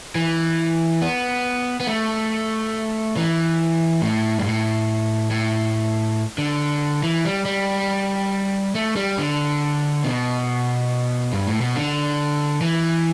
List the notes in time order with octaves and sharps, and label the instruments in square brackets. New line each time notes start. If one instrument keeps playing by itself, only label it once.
[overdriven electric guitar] E3
B3
B3
A3
E3
A2
G2
A2
A2
D3
E3
G3
G3
A3
G3
D3
B2
G2
A2
B2
D3
E3